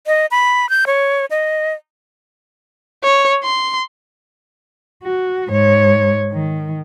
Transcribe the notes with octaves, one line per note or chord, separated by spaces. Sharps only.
D#5
B5
G6
C#5
D#5
C#5
C6
F#4
G#2 C#5
D#3